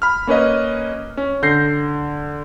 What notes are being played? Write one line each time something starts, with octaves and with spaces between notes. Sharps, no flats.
B5 F6
A#3 C#4 B4 D#5
C#4
D3 G6 A#6 C7